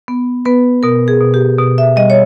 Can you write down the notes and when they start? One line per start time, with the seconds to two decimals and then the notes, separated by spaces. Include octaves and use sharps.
0.08 B3
0.45 B3 B4
0.83 B2 A#4
1.08 G#4
1.20 B2
1.34 G4
1.59 B2
1.78 E5
1.96 G3 D#5
2.10 C#5